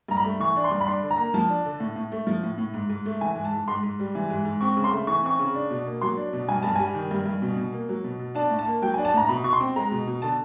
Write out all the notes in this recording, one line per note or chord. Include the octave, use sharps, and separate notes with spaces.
G2 A#5
B5
A3
E3 C#6
D4
C6
G2
B5
D4 C6
D3
A#5
A#3
F3 A5
D4
D3
A2
A2
A3
F3
A2
A2
G#2
G#2
A3
E3 G#5
G#2
A5
G#2
G#2 C6
G#2
G3
E3
G#2
G#2
C4 C#6
C#3
C6
A3
E3 C#6
C4 C#6
C#3
D4
B2
A#3
F#3 C6
D4
B2
G2 G#5
G2 A5
G3 G#5
D#3
G2
G2
B2
B2
A#3
F#3
B2
B2
D4 A5
A2
A5
A#3
F#3 G5
G#5
D4
A5
A2 A#5
B2 B5
B2 C#6
C6
C4
G#3 A#5
B2
B2
D3 A5